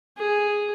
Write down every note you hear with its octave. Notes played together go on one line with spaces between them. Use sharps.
G#4